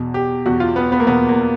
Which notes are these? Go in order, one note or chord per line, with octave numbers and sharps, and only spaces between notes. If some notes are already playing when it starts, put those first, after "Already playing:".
Already playing: E2 B2
G4
E2 B2 F#4
F4
B3
B3
A#3
E2 B2 B3
A#3